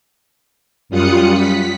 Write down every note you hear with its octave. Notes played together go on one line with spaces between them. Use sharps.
F#2 G3 F4 D#6 F#6 C#7
B6